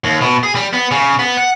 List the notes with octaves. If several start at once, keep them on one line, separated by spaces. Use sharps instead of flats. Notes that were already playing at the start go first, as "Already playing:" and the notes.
D#2
B2
G#4
G3
B3
C#3
B3
F#5